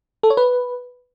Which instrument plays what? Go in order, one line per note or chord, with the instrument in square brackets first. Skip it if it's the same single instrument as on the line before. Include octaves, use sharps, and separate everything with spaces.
[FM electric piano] A4
C#5
B4